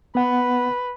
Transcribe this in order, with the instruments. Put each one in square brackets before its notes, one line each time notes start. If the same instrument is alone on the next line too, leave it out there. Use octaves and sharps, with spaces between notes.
[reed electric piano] B3 F#5 [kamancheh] B4